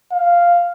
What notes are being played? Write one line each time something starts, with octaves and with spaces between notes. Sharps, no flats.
F5